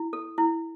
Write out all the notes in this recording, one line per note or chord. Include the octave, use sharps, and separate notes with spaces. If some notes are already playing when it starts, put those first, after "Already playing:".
Already playing: E4
A4
E4